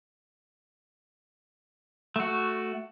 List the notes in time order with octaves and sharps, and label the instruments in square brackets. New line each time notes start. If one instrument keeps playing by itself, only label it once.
[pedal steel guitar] A3 F#4